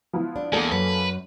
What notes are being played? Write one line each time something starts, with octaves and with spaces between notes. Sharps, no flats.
F3 B3 E4
D4
E2 A#3 A4 G#5
F#2 B4